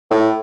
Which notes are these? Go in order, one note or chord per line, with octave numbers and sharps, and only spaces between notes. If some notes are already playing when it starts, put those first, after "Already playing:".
A2